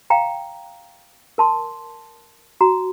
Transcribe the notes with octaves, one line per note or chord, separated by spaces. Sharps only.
F5 G5 A#5
A#4 A5 C6
F#4 A#5